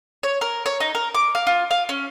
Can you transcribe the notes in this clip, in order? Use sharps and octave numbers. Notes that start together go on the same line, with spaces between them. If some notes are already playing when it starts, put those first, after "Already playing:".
C#5
A#4
C#5
D#4
A#4
D6
F5
F4
F5
C#4